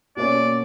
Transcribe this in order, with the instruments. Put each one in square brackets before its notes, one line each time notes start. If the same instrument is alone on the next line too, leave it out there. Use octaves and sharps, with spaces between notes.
[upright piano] B2 A#3 C#4 [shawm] D5